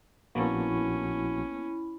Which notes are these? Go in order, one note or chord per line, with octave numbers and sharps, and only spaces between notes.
A#1 A#3 B3 C#4 E4 F#4 A5 B5